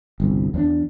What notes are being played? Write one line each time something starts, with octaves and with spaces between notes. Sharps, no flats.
G1 C2
E2 C4 D4